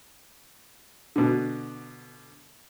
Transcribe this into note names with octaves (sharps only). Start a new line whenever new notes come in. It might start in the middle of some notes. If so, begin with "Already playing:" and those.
B2 D3